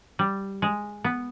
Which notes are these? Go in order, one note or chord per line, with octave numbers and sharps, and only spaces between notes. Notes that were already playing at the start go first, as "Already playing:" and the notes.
G3
G#3
B3